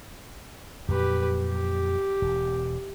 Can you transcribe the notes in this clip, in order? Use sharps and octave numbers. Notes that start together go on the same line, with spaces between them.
F2 A#2 F#3 G4 B4
G4
E1